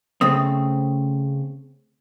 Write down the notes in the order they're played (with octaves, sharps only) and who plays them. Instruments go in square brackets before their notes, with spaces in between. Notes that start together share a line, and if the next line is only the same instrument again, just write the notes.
[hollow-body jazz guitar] C#3 A3 C4 [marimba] D#6